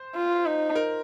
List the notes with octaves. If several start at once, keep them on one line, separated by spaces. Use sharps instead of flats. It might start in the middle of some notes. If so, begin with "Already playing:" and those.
Already playing: C5
F4
D#4
A#4